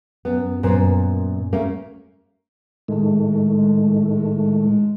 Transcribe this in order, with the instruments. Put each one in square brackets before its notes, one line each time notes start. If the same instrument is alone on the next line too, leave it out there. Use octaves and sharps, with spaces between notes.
[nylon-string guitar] F#2 B3
F#2 A#2 B3 C5
A3 A#3 C#4
[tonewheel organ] A2 D#3 A3 [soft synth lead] G#3